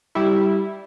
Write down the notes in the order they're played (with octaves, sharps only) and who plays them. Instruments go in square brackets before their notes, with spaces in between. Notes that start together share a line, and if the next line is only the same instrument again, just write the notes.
[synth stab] G3 E4